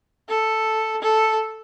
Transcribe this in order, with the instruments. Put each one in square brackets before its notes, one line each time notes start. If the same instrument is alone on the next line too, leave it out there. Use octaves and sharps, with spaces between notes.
[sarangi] A4
A4